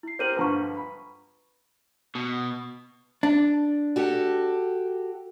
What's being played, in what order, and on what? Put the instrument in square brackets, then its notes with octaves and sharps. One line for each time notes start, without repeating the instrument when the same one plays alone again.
[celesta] E4 C7
[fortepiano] C4 G4 A#4 [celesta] G6 D#7 F#7
[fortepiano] G2 D3 F3 [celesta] B4 A#5 C#6
[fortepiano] B5
[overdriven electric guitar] B2
[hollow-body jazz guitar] D4
[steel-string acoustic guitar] F#4 G4 A4